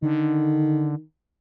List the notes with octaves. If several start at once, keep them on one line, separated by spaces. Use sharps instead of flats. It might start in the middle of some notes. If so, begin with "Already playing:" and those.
D3 D#3